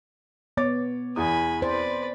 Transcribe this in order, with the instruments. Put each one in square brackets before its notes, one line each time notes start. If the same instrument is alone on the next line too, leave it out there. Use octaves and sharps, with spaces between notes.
[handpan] B3 [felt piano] C#5 D6 A6
[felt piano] E2 D#6 [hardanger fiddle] G#5 B5
[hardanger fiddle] B4 D5 [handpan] C5